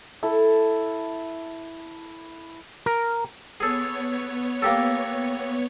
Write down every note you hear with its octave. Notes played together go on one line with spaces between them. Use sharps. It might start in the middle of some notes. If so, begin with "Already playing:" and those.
E4 A4
A#4
B3 G#4 A4 C#5
A#3 G4 A4